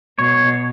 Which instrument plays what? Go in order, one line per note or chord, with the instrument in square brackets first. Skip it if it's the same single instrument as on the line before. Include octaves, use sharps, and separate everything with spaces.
[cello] B2 [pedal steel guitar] C#5